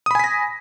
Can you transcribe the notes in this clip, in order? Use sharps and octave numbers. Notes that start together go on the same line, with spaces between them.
G#5 B5 D#6 A#6 B6